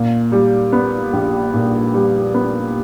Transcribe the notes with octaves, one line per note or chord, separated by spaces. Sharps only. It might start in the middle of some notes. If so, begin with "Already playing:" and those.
Already playing: A#2
G3
B3
A#1
A#2
G3
B3